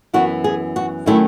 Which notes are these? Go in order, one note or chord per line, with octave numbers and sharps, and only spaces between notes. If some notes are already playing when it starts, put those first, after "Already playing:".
F#2 E3 B3 E4 F#4
G#4
F#4
D#3 F#3 A3 C#4 E4